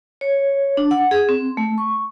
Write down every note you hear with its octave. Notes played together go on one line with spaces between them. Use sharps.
C#5
D4
F#5
G#4
C4
A3
C#6